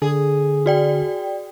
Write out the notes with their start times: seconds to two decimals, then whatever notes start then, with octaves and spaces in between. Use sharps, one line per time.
0.02 D3 G#4
0.66 F#4 D5 G5